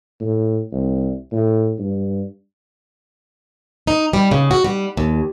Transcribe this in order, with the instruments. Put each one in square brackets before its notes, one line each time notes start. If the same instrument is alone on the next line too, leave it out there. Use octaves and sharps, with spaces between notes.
[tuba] A2
C2
A2
G2
[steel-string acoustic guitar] D#4
G3
C#3
F#4
G3
D#2